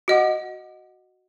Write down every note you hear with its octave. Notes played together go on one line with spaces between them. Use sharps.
F#4 D#5 F#5